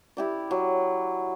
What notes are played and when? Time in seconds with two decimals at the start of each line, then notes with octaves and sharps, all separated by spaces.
0.17 E4 G4 D5
0.51 F#3